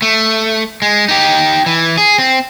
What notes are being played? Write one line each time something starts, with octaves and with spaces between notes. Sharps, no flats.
A3
G#3
D#4 G4
E3
G#4
C4